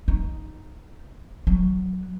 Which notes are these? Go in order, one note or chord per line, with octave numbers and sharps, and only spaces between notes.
D#4
F#3